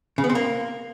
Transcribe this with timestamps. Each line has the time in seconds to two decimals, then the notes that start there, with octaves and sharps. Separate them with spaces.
0.18 C#3
0.24 B3
0.29 C4
0.35 A#3